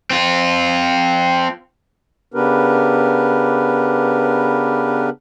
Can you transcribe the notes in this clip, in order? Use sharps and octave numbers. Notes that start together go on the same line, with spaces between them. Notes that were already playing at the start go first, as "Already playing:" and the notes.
C4 F4
C#3 B3 D4 G4 A#4 B4